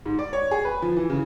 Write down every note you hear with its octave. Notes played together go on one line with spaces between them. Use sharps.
G#2
D5
C#5
G#4
B4
F3
E3
C#3